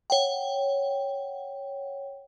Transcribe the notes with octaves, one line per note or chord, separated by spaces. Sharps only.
C#5 F#5 G5